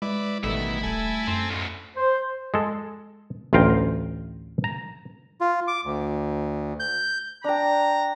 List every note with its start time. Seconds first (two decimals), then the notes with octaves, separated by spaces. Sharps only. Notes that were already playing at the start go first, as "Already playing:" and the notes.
0.02 G#3 E4 B4 D5
0.43 A1 B2 D#3 G3 A3 E4 E5
0.83 D#1 A4 G#5
1.28 F#2 C4
1.50 D2 A2
1.97 C5
2.54 G#3 A4
3.53 A1 D2 F4 F5 G5 A#5
4.64 A#5
5.41 F4
5.68 D6
5.85 D2
6.80 G6
7.44 D4 G5 A#5